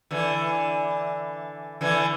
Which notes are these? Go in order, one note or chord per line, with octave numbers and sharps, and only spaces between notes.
D3 E3
D3 E3